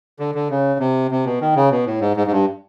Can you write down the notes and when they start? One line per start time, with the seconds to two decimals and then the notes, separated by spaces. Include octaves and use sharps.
0.20 D3
0.35 D3
0.50 C#3
0.80 C3
1.11 C3
1.26 B2
1.41 D#3
1.56 C#3
1.71 B2
1.86 A2
2.01 G#2
2.17 G#2
2.27 G#2
2.32 G2